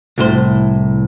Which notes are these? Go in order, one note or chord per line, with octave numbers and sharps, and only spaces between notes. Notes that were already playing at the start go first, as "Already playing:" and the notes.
C2 A2 C5